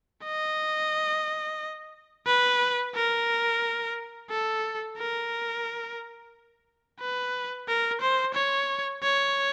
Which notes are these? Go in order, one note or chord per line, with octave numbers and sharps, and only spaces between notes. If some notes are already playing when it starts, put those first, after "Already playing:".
D#5
B4
A#4
A4
A#4
B4
A#4
C5
C#5
C#5